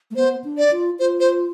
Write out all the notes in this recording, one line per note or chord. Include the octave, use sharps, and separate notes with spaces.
A3
B3 C5
D4
D5
F4
F4 C5
C5